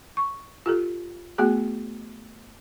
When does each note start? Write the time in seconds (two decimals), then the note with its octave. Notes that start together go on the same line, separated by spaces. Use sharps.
0.17 C#6
0.66 F4 G4 A4
1.38 A3 B3 F#4 G#4